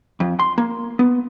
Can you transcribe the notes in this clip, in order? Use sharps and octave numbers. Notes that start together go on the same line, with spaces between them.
F2
C6
A#3
B3